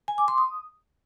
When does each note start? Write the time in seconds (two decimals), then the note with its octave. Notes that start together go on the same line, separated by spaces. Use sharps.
0.08 G#5
0.18 D6
0.28 C6
0.38 D#6